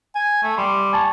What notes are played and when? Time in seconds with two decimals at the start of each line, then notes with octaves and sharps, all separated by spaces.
0.15 G#5
0.43 A3
0.58 G3 C6
0.93 G#5 A5 C#6